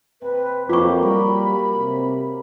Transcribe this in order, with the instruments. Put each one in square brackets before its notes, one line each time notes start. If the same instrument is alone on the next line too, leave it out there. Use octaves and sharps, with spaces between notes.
[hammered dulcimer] C3 [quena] B4
[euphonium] F2 [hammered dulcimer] F#3 A#3 G4 [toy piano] F4 C#6 [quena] D6
[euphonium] G3 [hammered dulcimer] A#4 [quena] B5
[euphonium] C3